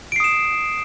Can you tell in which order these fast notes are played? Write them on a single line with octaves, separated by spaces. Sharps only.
D7 C7 D#6 E7